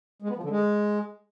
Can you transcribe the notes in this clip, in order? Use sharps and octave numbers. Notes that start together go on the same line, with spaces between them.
G#3
B3
F3
D3
G#3